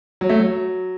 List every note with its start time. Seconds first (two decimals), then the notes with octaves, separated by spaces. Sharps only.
0.21 F#3
0.29 A3
0.40 F#3